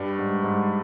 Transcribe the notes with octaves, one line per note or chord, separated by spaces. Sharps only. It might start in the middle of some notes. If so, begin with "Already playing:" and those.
Already playing: G2 G3
G#2
G#2